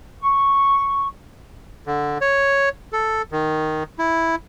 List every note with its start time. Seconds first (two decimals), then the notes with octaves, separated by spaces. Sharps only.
0.21 C#6
1.86 D3
2.21 C#5
2.93 A4
3.32 D#3
3.99 E4